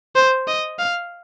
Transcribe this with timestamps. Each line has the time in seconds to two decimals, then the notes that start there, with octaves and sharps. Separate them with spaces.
0.15 C5
0.47 D#5
0.79 F5